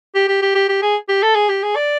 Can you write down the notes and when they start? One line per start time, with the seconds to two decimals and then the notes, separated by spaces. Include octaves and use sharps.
0.15 G4
0.28 G4
0.42 G4
0.55 G4
0.69 G4
0.82 G#4
1.09 G4
1.22 A4
1.35 G#4
1.49 G4
1.63 G#4
1.76 D5